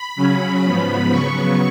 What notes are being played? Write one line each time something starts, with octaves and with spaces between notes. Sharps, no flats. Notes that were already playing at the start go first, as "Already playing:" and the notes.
Already playing: B5
C#3 F#3 C#4
G#2 F3 B3 B5
C#3 F#3 B3 C#6